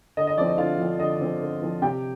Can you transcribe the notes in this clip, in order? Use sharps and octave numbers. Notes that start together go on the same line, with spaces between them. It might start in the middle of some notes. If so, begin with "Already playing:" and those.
D3 D#5
D#5
F3 C4 D5
D#5
D3 F4 F5
F3 C4
D3 D#5
F3 C4
D3
F3 C4
C3 G4 G5